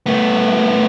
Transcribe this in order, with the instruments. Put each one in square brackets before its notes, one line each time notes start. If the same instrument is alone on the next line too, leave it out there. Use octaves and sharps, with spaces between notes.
[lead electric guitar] A3 B3